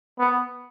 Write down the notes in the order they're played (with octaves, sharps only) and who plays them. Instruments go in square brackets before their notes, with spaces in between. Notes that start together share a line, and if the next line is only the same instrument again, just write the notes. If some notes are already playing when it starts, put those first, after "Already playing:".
[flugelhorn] B3